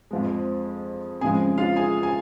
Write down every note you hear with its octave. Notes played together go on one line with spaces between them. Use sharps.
F2 F3 G#3
F2 C#3 F3 G#3 G#4 G#5
F4 F5
G#4 G#5
G#5